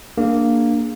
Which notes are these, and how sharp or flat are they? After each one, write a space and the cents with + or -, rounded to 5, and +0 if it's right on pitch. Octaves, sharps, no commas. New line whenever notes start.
A#3 +0 D4 +0 G#4 +0